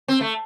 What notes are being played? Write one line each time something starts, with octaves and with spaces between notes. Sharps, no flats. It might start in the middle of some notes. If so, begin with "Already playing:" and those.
C4
A3